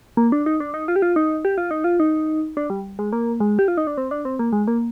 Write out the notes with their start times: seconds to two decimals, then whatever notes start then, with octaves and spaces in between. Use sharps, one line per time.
0.17 A#3
0.32 D4
0.46 D#4
0.60 D4
0.74 D#4
0.88 F4
0.96 G4
1.02 F4
1.16 D#4
1.45 G4
1.58 F4
1.71 D#4
1.84 F4
2.00 D#4
2.57 D4
2.70 G3
2.99 G#3
3.13 A#3
3.40 G#3
3.59 G4
3.68 F4
3.77 D#4
3.87 D4
3.98 C4
4.11 D4
4.25 C4
4.39 A#3
4.53 G#3
4.67 A#3